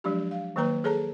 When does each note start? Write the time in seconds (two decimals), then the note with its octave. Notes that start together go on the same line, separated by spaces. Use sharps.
0.04 F3 F#3 G#3 D4 G4
0.31 F5
0.56 D#3 F#3 A#3 B4 A#5
0.84 G#4 A4 C#5 A5 A#5